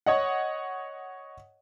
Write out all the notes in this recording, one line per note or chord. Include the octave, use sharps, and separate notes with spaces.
C#5 D#5 F#5